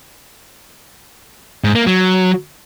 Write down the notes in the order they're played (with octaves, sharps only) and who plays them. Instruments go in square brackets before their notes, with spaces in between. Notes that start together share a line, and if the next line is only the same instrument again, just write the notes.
[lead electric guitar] G#2
A#3
F#3